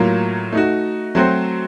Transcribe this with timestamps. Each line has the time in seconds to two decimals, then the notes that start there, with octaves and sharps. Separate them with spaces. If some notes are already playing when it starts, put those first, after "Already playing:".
Already playing: A2 F#3 A#3 F4
0.52 A3 D#4 F#4
1.15 F#3 A3 C4 F#4 C5